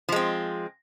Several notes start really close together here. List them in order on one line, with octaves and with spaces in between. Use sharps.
F3 G#3 C4